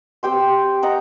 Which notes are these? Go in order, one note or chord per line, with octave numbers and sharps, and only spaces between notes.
C4 G4 G5 C6
D#5 F#5 A#5